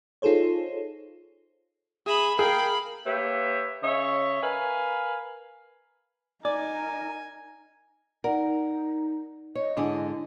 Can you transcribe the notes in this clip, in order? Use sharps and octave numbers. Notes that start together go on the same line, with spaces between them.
D#4 F4 G#4 A4 C5 C#5
G#4 E5 B5 D#6
G#4 A#4 F5 G5 B5
A#3 G4 B4 C#5 E5
C#3 C#5 D#5 E5
A#4 B4 F5 G#5
D#4 A#4 D5 G#5
D#4 A#4 D5 F#5
C#5 D#5
G#2 D3 D4 E4 G#4